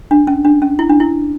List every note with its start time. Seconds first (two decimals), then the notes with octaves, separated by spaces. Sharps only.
0.11 D4
0.27 C#4
0.45 D4
0.62 C#4
0.79 E4
0.89 D4
1.00 E4